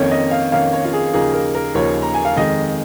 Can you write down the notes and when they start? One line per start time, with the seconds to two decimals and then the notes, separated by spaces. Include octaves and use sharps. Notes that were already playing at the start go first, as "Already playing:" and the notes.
Already playing: F2 D#3 A#3 C#4 C#5
0.11 D#5
0.31 F5
0.52 F2 D#3 A#3 C#4 F5
0.73 C#5
0.85 F4
0.93 G#4
1.13 D#2 C#3 F3 A#3 D#4 G#4
1.33 A#4
1.55 A#4
1.75 D#2 C#3 F3 A#3 D#4 C#5
2.02 A#5
2.15 G#5
2.25 F5
2.36 F2 D#3 G#3 D#5